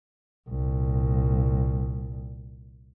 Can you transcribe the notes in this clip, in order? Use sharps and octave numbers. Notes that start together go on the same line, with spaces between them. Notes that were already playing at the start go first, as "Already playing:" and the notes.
C2 A#2